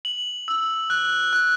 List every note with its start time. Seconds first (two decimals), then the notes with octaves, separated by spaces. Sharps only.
0.05 F#7
0.48 E6
0.90 F#6
1.33 F#6